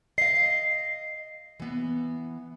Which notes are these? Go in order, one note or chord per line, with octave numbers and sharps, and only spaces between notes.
D#5 F5 C7
E3 B3